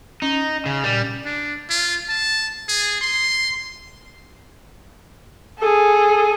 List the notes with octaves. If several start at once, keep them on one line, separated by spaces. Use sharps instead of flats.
C#4 D#4
C#3
A#2 G3
D4
F4
A5
G#4
C6
G#4 A4